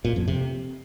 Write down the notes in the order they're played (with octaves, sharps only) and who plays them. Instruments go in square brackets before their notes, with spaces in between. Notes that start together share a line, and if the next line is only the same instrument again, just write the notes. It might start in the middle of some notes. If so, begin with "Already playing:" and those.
[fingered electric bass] A#2
F2
C3